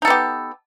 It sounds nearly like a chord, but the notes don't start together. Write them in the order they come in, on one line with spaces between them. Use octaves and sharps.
D#4 A4 B3 G4